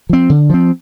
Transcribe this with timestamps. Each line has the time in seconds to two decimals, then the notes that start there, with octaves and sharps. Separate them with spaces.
0.09 F3 C4
0.30 D3
0.50 F3 C4